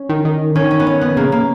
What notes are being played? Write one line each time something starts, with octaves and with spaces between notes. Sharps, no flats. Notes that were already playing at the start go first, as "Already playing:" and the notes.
Already playing: C#4
D#3
D#3
D#3 C#4
C#4
B3
C#4
B3
C#3 A#3
A#3